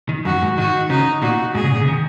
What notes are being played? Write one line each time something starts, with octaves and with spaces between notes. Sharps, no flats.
D#3
F#2 F#4
G#2
D#3 F#4
C#3 D#4
A#2 F#4
G#2 G#4
C#3
A#2
C#3
D#3